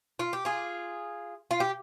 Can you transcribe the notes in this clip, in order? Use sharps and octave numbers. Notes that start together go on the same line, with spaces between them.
F4
G4
F4 G#4
F4
G4